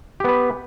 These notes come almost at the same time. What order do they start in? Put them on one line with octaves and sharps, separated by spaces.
G4 B3 B4